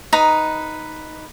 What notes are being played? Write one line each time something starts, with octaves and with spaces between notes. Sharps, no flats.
D#4 B4 A#5 D#6